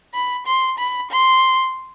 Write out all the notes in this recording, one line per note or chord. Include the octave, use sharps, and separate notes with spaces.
B5
C6
B5
C6